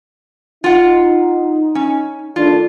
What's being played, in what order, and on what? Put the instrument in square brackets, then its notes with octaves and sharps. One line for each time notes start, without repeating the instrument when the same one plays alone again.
[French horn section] D#4 [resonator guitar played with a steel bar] F4 F#5
[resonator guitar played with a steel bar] C#4
[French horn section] D#3 A3 D4 [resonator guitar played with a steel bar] F4